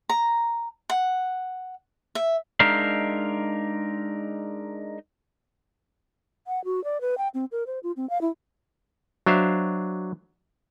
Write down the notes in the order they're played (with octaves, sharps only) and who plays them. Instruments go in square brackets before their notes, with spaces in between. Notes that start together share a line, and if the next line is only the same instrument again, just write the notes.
[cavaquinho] A#5
F#5
E5
[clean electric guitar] G#3 D4 D#4 A#4 E5 F5
[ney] F#5
F#4
D5
B4
G5
C4
A#4
C5
F4
C4
F5
E4
[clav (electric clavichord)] F#3 D4 C5 E5 F5